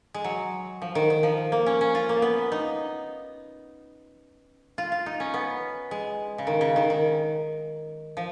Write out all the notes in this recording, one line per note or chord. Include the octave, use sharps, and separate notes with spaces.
G#3
F#3
F3
D#3
D#3
F3
A#3
C#4
C#4
F4
A#3
B3
D#4
F4
F4
D#4
C#4
B3
G#3
C#3
D#3
C#3
D#3
D#3
F3